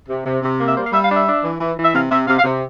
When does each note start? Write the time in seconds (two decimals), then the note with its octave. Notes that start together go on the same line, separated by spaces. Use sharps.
0.09 C3
0.26 C3
0.42 C3
0.60 A#3
0.67 E5
0.76 G3 C5
0.84 F5
0.93 G3 E5
1.04 F5
1.10 D4
1.15 E5
1.26 D4
1.43 E3
1.61 E3
1.77 E3
1.85 E5
1.94 C3 F5
2.11 C3 E5
2.27 C3 F5
2.38 F5
2.44 C3